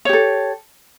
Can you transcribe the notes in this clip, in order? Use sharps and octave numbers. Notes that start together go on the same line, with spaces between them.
G4 A4 C#5